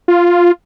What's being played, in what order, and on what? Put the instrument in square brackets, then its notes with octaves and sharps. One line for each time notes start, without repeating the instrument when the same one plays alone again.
[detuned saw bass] F4